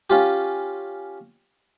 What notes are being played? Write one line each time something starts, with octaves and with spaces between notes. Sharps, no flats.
C#4 F4 G4